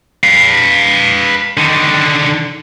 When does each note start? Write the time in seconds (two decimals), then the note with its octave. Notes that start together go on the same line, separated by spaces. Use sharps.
0.23 B4 F5
1.57 D3 D#3